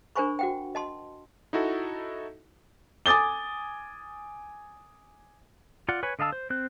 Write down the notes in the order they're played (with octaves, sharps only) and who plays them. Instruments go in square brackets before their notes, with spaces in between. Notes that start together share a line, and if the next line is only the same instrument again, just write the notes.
[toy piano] D4 A#4 C5 G#5 B5 C#6
F#4 F#5 G5
D#5 A5 C6
[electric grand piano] D#4 E4 F#4 A4
[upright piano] G#5 D6 D#6 A6 G7
[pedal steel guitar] F4 D5 F#5
B4 C#5 G#5
D3 D#5 F5 A5 E6
C5
C4 C5 F#6